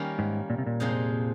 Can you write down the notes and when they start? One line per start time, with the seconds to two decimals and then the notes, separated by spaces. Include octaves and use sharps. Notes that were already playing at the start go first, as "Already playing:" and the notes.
Already playing: D#3 G3 A#3 C#4
0.19 G#2
0.50 A#2
0.58 C3
0.67 A#2
0.80 F2 C3 F3 G#3 D#4